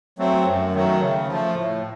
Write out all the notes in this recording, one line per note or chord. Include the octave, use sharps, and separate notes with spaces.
F#3 A3 C4
F#2
D#3 F#3 A3
C#3
F3 A3
A2